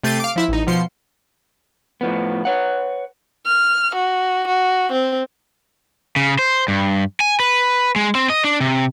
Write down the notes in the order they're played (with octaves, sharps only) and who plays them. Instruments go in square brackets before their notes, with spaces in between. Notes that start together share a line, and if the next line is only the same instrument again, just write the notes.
[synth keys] C3 A3 G6 A6 C7 D#7
F5 D6
F3 E4 E5
A1 D#4
B2 F3 C6 C#7
[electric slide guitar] A2 F3 B3
B4 C#5 F#5
[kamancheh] F6
F#4
F#4
C4
[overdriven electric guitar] C#3
C5
G2
G#5
B4
G#3
C4
D#5
D4
C3